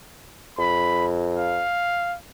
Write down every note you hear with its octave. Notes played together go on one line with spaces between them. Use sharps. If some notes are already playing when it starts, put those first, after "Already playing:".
F2 B5
F5